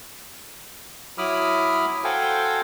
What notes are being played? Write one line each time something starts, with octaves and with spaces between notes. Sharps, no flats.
F#3 E4 B5 D6 D#6 F6
F#4 A4 C5 F5 G5 G#5